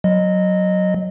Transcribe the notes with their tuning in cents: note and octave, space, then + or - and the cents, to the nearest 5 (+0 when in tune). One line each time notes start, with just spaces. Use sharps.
F#3 +0 D#5 -15